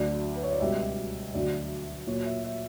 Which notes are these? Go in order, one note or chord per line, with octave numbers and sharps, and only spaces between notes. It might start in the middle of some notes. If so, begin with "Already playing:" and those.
Already playing: D2 D3 F#3 D5
B4
C#5
D5
C#2 B2 G3 E5
D2 D3 F#3 D5
A#2 F#3 C#5
E5
E5